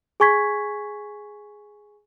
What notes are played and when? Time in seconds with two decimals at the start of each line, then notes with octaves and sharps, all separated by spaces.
0.20 G#4 G#5 C#6 G#6 B6